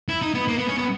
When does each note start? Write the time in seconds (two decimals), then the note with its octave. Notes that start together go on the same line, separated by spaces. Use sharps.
0.09 E4
0.22 D#4
0.34 B3
0.48 A#3
0.58 B3
0.68 C#4
0.78 B3